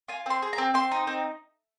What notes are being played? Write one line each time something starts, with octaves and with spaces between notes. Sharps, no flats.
F4 G#5
C4 C6
G#4
A#5
C4
C4 C6
D#4
C4